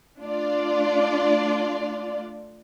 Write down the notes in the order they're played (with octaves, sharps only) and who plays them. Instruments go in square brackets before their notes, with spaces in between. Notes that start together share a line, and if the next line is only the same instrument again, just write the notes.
[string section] A3 D4 F4 D5